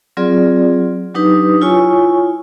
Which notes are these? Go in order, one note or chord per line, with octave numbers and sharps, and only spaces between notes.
F#3 C4 F4 G#4 D5
F#3 D4 D#4 G4 B4 D#6
E4 F4 C#5 G#5 C#6